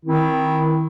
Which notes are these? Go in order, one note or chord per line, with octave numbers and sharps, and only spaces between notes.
D#3 C4 E4